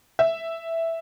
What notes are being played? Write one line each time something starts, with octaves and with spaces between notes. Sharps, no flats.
E5